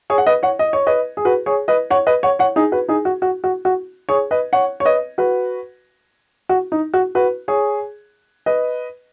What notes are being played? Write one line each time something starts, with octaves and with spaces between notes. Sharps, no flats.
G#4 C#5
F#5
B4 D#5
C#5 F#5
D#5
C#5
B4 D#5
G#4
F#4 B4
G#4 C#5
B4 D#5
C#5 F#5
B4 D#5
C#5 F#5
C#5 F#5
D#4 G#4
F#4 B4
D#4 G#4
F#4
F#4
F#4
F#4
G#4 C#5
B4 D#5
C#5 F#5
C#5
B4 D#5
F#4 B4
F#4
D#4
F#4
F#4 B4
G#4 C#5
B4 D#5